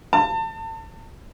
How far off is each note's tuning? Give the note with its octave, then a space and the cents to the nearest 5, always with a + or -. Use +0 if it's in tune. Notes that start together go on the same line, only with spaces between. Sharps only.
A5 +30